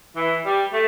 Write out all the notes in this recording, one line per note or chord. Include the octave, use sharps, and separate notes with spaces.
E3
G3
A3